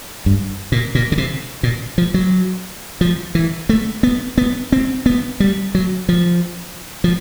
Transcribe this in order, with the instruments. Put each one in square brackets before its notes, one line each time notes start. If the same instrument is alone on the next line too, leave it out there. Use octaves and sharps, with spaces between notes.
[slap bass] G2
A#2
A#2
C#3
C3
A#2
F3
F#3
F3
E3
A3
B3
B3
C4
B3
G3
F#3
F3
F3